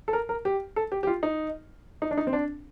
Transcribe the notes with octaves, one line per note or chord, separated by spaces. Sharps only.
A4
A#4
A#4
G4
A4
G4
G4
F4
D#4
D#4
D4
D#4
C4
D4